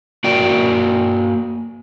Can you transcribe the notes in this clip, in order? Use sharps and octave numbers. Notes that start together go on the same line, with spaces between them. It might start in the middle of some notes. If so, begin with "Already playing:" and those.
A#3 F#4 D5 G5